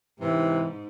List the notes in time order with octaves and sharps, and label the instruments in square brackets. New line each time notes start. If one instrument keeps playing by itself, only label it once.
[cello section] G#2 [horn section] C3 E3